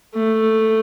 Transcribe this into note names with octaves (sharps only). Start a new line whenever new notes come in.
A3